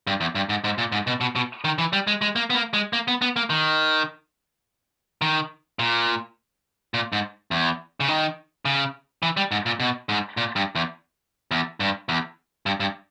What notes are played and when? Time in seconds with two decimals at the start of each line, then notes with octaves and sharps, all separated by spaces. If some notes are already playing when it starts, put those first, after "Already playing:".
0.07 G2
0.21 E2
0.35 G2
0.49 G#2
0.64 G#2
0.78 A#2
0.92 G#2
1.07 B2
1.21 B2
1.36 B2
1.64 D#3
1.78 E3
1.93 G3
2.07 G#3
2.22 G#3
2.36 A#3
2.50 B3
2.55 A#3
2.73 G#3
2.93 A#3
3.08 B3
3.22 B3
3.36 A#3
3.50 D#3
5.22 D#3
5.79 A#2
6.94 A#2
7.13 G#2
7.51 E2
8.00 C#3
8.08 D#3
8.65 C#3
9.23 E3
9.37 G3
9.52 G#2
9.66 A#2
9.80 B2
10.09 G#2
10.37 A#2
10.56 G2
10.75 E2
11.51 E2
11.80 G2
12.09 E2
12.66 G2
12.80 G2